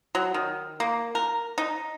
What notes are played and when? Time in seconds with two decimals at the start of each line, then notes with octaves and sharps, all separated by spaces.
0.15 F#3
0.34 D#3
0.80 A#3
1.15 A#4
1.58 D#4